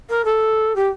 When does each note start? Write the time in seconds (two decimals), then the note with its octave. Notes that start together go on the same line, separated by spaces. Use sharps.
0.09 A#4
0.25 A4
0.75 G4